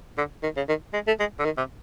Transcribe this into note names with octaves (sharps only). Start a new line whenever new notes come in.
D3
D#3
C#3
D#3
G#3
A3
G#3
D3
D#3
C3